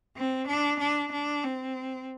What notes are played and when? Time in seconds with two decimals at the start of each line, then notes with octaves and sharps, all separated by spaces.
0.16 C4
0.48 D4
0.80 D4
1.12 D4
1.44 C4